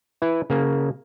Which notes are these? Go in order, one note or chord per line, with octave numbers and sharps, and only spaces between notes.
E4 B4
C#3 A#3